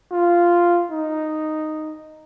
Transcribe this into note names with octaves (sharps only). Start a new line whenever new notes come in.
F4
D#4